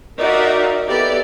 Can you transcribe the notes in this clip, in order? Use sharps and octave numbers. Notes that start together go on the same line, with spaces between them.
D#4 F#4 A#4 D5 E5 F5
B3 E4 G4 A4 D5